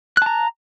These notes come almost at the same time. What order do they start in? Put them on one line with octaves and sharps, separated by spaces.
F#6 A5 A#5